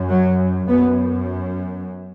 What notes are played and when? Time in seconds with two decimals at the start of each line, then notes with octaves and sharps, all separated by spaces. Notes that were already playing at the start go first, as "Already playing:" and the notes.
Already playing: F#2
0.09 F#3
0.68 F#2 B3